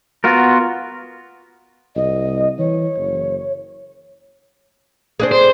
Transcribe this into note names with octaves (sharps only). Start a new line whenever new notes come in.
B3 F4 F#4 A#4
C2 D#5
E3 C#5
F#1
C4 D4 G#4
C5